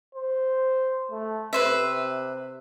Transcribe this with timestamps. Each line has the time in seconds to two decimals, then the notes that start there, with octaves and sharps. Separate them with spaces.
0.15 C5
1.11 A3
1.53 C3 B4 C5 E5